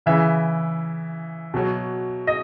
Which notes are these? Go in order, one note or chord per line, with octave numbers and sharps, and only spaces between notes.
C#3 E3 E5
B2 F#3
D#5